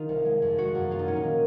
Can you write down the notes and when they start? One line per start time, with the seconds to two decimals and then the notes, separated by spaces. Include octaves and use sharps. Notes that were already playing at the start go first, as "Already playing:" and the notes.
Already playing: D#3 D#4 F4
0.09 C2
0.25 G#3
0.42 F2
0.58 G#3 F#4
0.75 F#2
0.91 A#3 F4
0.99 D#4
1.07 A#2 C#4
1.16 D#4
1.23 D#3